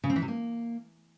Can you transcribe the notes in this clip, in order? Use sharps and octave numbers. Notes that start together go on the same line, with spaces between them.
C#3
C4
E3
C3
A#3